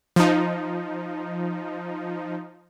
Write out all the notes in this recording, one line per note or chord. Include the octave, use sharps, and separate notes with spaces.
F3 D#4